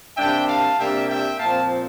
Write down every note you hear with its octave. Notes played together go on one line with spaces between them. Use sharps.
C3 G3 A#3 D4 E5 G5
F5 A5
C3 G3 A#3 D4 E5 G5
E5 G5
A#2 F3 C4 F5 A5